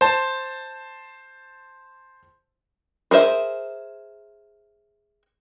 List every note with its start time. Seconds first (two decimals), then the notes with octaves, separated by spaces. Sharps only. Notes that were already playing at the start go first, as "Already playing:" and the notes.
0.01 C5 A5
3.11 G#4 A#4 C5 E5